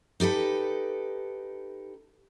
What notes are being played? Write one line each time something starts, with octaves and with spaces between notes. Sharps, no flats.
D#4 G4 A4 B4